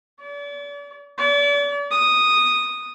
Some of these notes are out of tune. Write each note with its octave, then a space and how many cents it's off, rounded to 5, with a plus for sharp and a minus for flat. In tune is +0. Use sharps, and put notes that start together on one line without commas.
D5 -40
D5 -40
D#6 -5